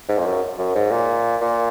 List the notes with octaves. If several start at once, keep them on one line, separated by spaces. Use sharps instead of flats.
G#2
F2
F#2
F#2
G#2
A#2
A#2